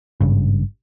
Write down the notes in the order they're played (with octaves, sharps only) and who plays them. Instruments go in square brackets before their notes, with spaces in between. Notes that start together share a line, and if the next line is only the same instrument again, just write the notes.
[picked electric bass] G#1 G2 C#3